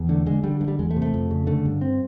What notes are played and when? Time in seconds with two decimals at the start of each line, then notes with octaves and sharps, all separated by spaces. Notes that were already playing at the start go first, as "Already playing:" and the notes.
Already playing: E2
0.09 D3 A3
0.26 D3 G#3
0.43 D3 G3
0.61 G2
0.68 G3
0.79 E2 G#3
0.91 A3
0.96 C3
1.02 A3
1.14 F2
1.31 C#3
1.47 D3 A3
1.65 G2
1.81 C4